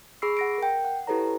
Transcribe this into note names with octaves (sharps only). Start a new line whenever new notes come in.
G#4 B5 C#6 E6 C7
F#5 A#6 D7
A#4 G5
F#5
E4 G4 A4 B4 C#5 A#5